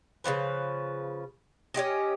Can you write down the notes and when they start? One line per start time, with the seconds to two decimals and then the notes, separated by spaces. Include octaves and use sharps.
0.24 C#3 E3 F3 B4
1.74 C#4 D#4 G4 D#5